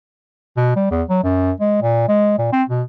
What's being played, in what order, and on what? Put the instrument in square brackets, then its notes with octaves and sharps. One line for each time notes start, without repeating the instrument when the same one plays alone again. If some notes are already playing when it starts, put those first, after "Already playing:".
[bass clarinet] B2
G3
E2
F#3
F#2
G#3
A#2
G#3
A#2
C4
B2